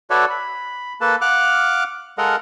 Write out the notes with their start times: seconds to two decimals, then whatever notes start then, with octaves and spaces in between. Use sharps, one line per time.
0.10 F#4 A4 B4 C#5 D5 E5
0.30 B5
1.01 A#3 A4 B4 A5
1.21 F5 F#5 D6 F6 F#6
2.18 G#3 A4 A#4 D#5 F5 F#5